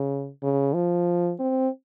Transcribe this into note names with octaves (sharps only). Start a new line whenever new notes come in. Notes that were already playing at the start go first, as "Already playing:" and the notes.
Already playing: C#3
C#3
F3
C4